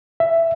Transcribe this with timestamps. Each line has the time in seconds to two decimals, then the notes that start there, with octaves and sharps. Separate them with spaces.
0.20 E5